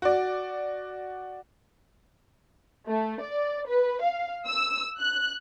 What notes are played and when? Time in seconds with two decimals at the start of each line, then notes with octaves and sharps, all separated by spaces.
0.02 F#4 D5
2.88 A3
3.21 D5
3.68 B4
4.02 F5
4.47 E6
5.00 F#6